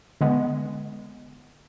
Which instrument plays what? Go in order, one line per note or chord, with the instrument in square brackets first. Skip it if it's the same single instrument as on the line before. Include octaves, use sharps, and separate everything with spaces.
[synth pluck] D3 G#3 B3